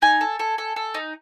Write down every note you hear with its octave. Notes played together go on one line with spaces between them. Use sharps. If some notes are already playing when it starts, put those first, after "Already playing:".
D#4 G#5
A4
A4
A4
A4
D#4